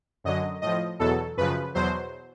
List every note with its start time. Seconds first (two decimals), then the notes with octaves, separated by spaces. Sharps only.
0.24 F#2 D3 F#3 D#5
0.62 A2 F3 D#5
0.99 E2 B2 F#3 A4
1.37 F#2 C#3 F3 B4
1.75 E2 B2 F#3 C5